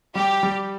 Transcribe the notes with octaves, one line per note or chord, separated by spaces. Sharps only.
G3 G4
G3